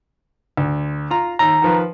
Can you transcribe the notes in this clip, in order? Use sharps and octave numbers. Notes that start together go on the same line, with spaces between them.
D2
F4 A#5
D#2 A#5
D#3 F3 B4